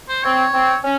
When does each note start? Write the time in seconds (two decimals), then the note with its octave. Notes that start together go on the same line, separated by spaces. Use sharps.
0.08 C5
0.23 C4 C#5
0.53 C4
0.83 C#4